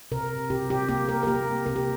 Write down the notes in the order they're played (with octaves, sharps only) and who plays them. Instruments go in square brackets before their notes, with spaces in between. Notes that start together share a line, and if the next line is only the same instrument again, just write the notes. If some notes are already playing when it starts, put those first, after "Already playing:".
[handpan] C3 A#4
C3 G4
G4
A#3 G4
A#4
A#4
A#3 G4
C3 A#4
G4